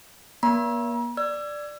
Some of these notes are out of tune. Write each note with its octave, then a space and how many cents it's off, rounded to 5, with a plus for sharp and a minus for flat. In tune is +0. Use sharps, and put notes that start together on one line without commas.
A#3 +45 D5 -35 A#5 +45
D5 +0 E6 +35